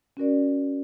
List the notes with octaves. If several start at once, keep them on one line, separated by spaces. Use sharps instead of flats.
C#4 F#4 A#4 D5